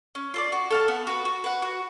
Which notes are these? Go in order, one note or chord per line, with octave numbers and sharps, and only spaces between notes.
C#4
F4 A4 D5
F#4
A4 F5 A5
B3
F#4 B4
F#4
B4 F#5
F#4